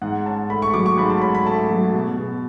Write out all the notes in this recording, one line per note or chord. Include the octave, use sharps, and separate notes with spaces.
G#2 F#5
C#4 A5
A3 B5
C#6
F#3 D6
C#6
G#2 B5
A5
C#4 B5
B5
A3 A5
F#3
B2
B2